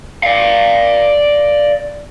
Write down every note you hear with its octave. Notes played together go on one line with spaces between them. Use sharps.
D5 F5